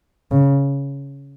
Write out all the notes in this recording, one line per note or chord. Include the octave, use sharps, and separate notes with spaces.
C#3